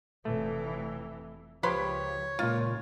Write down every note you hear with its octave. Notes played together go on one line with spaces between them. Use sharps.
F1 E3 A3
C#2 F3 G4 B4 C#5 B5 C6
C#2 A#2 F4